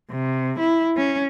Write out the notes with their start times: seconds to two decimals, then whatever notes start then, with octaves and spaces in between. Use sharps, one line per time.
0.11 C3
0.59 E4
0.97 C#4